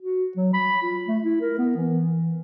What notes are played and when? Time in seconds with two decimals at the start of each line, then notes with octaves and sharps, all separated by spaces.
0.02 F#4
0.37 F#3
0.53 B5
0.82 F4
1.07 A3
1.24 E4
1.41 A#4
1.58 B3
1.77 E3